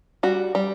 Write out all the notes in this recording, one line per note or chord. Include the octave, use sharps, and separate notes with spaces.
G3 F#4
G3